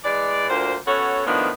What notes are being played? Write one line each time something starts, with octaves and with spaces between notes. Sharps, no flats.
E3 G#3 D5
D2 A#2 A#3 C5
B3 C#4 F#4 A4 C#5
A2 D#3 F3 B3 D4